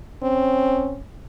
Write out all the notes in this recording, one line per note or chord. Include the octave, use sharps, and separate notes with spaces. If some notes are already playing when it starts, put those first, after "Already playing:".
C4 C#4